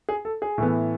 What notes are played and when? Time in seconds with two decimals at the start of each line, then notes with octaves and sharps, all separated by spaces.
0.09 G#4
0.25 A4
0.42 G#4
0.58 A2 E3 B3